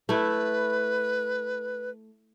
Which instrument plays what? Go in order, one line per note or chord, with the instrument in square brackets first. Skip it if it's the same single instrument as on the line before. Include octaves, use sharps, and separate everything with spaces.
[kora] A3 E4 [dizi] B4